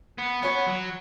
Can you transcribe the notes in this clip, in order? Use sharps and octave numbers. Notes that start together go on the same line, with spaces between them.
B3
B3 C#4 F#4 C#5
F#3